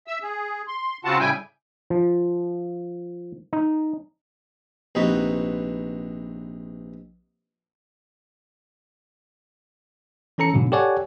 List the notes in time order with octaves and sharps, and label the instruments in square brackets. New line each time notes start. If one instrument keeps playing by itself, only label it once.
[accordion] E5 E6
G#4
C6
C#3 C4 F4 F#4 F#5 A5
A2 C#3 G3 E4 G5 G#5
[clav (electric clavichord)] F3
D#4
[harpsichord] A#1 C3 B3 D#4 F#4 B4
[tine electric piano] E3 C#4 A4 A#5 C#7
G#2 B2 D3 F#3
G4 A4 C#5 D5 F#5 G#5